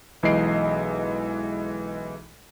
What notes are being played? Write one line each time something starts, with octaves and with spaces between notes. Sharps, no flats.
B1 E3 G#3 D#5 C7 D7